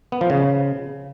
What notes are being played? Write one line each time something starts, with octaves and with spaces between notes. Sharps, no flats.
B3
F3
C#3